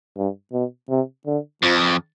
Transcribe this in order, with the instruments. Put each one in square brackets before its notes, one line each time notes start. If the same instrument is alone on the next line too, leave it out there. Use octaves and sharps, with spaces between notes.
[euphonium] G2
B2
C3
D3
[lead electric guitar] F2 [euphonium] F3